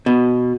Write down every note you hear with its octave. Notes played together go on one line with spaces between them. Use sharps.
B2